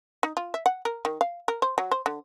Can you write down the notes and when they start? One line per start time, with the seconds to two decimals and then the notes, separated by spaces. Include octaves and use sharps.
0.23 D#4
0.37 F4
0.54 E5
0.66 F#5
0.85 A#4
1.05 D#3
1.21 F5
1.48 A#4
1.62 C5
1.78 F#3
1.91 C5
2.06 D3